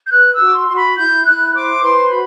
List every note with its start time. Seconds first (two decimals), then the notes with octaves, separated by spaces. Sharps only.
0.05 G6
0.11 B4 F#6
0.32 E6
0.40 F#4 D6
0.54 C6
0.68 F#4 C6
0.75 B5
0.97 E4 G6
1.25 E4 F#6
1.53 C5 D6
1.82 B4 C6
2.10 F#4 B5